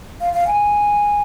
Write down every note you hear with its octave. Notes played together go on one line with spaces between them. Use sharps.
F5
F5
G#5